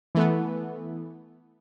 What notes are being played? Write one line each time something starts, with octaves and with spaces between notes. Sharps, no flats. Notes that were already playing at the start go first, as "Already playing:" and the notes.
E3 A3 B3